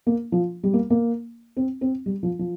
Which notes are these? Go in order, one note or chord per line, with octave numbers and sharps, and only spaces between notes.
A#3
F3
G3
A#3
A#3
C4
C4
G3
F3
F3